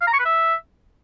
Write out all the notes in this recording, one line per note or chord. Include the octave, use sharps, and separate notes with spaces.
F5
A#5
C#6
B4
E5